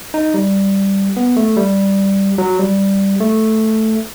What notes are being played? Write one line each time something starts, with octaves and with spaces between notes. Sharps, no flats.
D#4
G3
B3
A3
G3
F#3
G3
A3